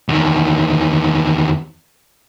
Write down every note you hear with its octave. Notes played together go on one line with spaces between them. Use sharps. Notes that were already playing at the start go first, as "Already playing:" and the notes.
E2 D#3